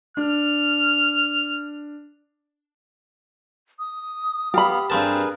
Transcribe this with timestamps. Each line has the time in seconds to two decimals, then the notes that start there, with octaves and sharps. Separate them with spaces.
0.17 D4 F6
3.79 D#6
4.54 B3 G4 F5 B5 F6
4.90 G2 C4 G#4 A#4 B4 A5